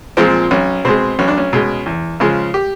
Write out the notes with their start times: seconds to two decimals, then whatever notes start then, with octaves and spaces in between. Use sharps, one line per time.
0.17 A#2 F3 G#3 C4
0.51 B1 C#4
0.85 B2 G#3 C4
1.19 B1 C#4
1.28 D4
1.37 C#4
1.53 B2 G#3
1.86 E2
2.20 C#3 F3 G#3
2.54 G4